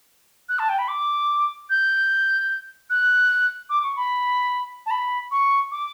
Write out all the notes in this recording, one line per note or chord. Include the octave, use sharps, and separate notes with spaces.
F#6
A5
G5
B5
D6
G6
F#6
D6
C#6
B5
A5
B5
C#6
D6